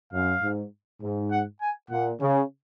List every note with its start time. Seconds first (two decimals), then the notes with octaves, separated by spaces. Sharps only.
0.13 F#2 F5
0.43 G#2
1.01 G#2
1.31 F#5
1.61 G#5
1.90 A#2 F#5
2.20 C#3